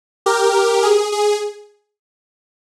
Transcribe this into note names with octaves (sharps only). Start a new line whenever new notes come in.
G4 A#4
G#4
G#4